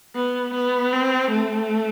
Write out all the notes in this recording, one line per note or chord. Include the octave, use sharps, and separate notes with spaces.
B3
B3
C4
A3